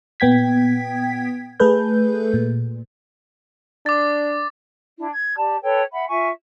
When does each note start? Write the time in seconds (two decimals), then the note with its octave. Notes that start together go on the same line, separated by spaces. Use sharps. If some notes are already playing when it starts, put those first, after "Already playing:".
0.20 A#2 B3 G5 G#6 B6
1.60 A3 G#4 A4 B4 G6
2.34 A#2
3.86 D4 D6 A6
4.98 D4 E4
5.10 G#6
5.36 G4 D5 A5
5.62 A4 B4 C#5 G5
5.92 E5 F#5 B5
6.09 F4 E5 G#5 C#6